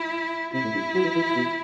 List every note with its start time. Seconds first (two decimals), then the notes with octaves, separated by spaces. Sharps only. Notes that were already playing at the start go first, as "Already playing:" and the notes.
Already playing: E4
0.53 C3 E4
0.64 A2
0.74 G2
0.95 F#3
1.04 E3
1.16 E3
1.36 B2